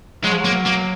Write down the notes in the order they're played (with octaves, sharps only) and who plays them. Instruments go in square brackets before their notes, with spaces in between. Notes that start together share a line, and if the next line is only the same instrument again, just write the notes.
[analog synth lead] F#3 [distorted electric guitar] G#3
[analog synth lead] F3
[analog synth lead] F#3 [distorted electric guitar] A#3
[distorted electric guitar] A#3